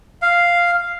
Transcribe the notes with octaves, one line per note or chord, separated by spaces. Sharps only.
F5